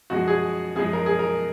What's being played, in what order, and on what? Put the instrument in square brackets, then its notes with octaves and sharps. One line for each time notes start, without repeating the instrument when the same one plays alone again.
[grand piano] F#2 F3 G#3 F#4
G#4
F#2 F3 G#3 G#4
A#4
G#4
A#4